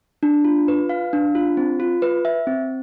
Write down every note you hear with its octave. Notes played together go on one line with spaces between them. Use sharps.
D4
F4
B4
F5
D4
F4
C4
F4
B4
E5
C4